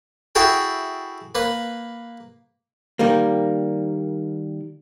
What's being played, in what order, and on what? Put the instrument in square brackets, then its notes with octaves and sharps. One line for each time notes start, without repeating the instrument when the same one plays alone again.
[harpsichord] E4 F#4 G#4 A4 G5
A#3 B4
[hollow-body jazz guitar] D#3 G3 A#3